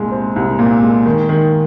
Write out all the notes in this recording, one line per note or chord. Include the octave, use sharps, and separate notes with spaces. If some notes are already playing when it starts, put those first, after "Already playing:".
Already playing: C2 A#2 G#3
C4
C2
A#2
G#3
D#3
D#3